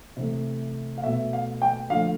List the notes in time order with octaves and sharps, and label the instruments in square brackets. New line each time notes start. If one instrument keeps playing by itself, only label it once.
[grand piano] C3 E3 A3
F5
B2 A3 E5
F5
G5
D3 F3 A3 F5